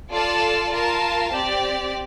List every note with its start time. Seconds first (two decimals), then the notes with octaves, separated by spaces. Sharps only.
0.11 F4 A4 D5 F5 A5
0.72 F4 A#4 F5 A5
1.32 C4 G4 D5